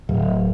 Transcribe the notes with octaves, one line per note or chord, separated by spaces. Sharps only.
D1